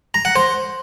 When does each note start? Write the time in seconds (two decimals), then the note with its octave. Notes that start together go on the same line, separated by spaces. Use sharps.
0.14 A#5
0.25 F#5
0.36 C5